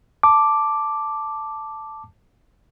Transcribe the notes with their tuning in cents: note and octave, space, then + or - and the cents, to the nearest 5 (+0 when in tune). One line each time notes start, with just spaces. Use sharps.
A5 +0 D6 +0